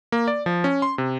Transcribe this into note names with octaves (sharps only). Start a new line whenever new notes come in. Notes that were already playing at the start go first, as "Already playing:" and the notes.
A#3
D5
F3
C#4
C6
C3